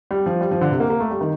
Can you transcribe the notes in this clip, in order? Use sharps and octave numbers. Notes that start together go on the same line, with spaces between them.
G3
F3
G3
F3
D3
C3
A#3
A#3
A3
G3
D#3